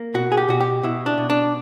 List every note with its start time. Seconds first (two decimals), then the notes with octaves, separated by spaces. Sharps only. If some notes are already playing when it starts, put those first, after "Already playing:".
Already playing: A#3
0.14 B2 F#4
0.32 G#4
0.37 G4
0.48 B2 F#4
0.60 G4
0.83 B2 E4
1.06 D4
1.18 B2
1.30 D4